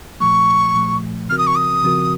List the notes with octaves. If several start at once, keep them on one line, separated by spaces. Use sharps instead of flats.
A#2 F3 A3 C#6
A#2 F3 A3
C#3 F3 C4 F#4 A#4 F6
D#6
C#6
D#6
C#3 F3 C4 F#4 A#4